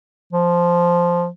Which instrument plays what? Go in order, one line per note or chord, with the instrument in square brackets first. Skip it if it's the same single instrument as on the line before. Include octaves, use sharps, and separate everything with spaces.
[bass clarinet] F3